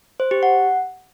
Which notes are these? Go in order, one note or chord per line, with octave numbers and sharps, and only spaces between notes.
C5
G4
F#5